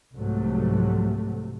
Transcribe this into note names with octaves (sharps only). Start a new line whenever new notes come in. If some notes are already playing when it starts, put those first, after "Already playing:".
C2 G#2 C3 F3 F#3 A3